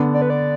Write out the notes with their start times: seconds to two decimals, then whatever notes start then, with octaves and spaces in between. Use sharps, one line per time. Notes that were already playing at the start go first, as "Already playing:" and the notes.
Already playing: D3 B3 D4
0.14 D5
0.22 B4
0.30 D5